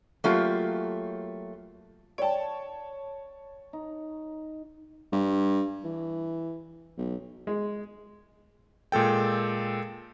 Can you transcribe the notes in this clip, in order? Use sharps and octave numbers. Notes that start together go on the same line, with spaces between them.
F#3 A3 A#3 F4 G4
C#5 D5 G5 A5
D#4
G2
E3
B1
G#3
A#2 G#3 A4 G5